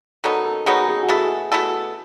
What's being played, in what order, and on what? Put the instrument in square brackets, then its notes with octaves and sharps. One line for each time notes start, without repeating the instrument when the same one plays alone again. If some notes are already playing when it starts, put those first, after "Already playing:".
[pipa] D#3 F#3 B3 D#4 [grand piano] A4
[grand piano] A4
[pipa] D#3 F#3 B3 D#4 [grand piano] G#4
[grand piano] G#4
F#4
[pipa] B2 A3 E4 A4 [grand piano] G#4
[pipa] B2 A3 E4 A4